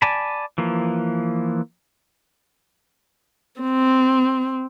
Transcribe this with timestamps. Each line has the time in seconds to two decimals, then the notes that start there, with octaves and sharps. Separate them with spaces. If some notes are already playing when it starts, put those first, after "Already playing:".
0.02 D5 G#5 A5 B5
0.58 E3 F3 A#3
3.61 C4